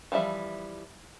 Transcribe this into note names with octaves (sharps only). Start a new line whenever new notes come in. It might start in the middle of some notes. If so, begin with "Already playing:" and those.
E3 F3 G3 E5